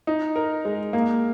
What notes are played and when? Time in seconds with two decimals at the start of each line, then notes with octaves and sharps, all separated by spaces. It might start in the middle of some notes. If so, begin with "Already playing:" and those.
0.07 D#4
0.36 A#4
0.65 G#3
0.93 A#3